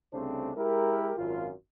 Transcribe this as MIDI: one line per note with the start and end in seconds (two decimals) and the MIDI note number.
0.13 0.52 36
0.13 0.52 49
0.13 0.52 57
0.13 0.52 60
0.13 0.52 62
0.13 0.52 72
0.56 1.13 56
0.56 1.13 64
0.56 1.13 67
0.56 1.13 70
1.17 1.50 32
1.17 1.50 42
1.17 1.50 65